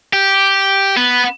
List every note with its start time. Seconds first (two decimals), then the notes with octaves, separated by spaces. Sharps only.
0.13 G4
0.97 B3